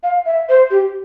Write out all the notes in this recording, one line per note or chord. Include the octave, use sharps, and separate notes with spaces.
F5
E5
C5
G4